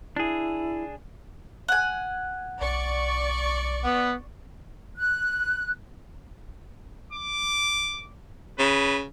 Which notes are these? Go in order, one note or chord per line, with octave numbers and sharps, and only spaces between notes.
D4 E4 G#4
F#5 G#5
B1 D5 C#6
B3
F#6
D6
C#3 B4